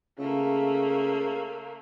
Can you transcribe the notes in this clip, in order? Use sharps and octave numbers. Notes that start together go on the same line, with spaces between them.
C#3 A3 A#3